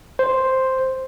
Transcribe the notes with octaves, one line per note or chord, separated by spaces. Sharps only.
C5